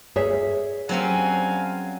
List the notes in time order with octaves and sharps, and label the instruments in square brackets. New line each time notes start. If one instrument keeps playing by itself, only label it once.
[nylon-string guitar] G#4 C#5 E5
[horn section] G2 F5 G#5 [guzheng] F#3 C4 C#4